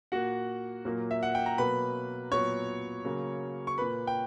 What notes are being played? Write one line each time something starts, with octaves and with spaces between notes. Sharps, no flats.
A#2 A#3 F#4 F#5
A#2 F#3 A#3
E5
F#5
G5
A#5
B2 F#3 A#3 B4 B5
A#2 F#3 B3 C#5 C#6
C#3 F#3 A#3
C#6
A#2 A#3 B4 B5
G5